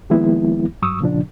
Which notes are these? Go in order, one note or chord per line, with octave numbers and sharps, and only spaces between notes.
D#3 F3 G#3 A#3 B3 E4
G2 F#3 C#6 D#6 E6
A#2 C#3 F3 D4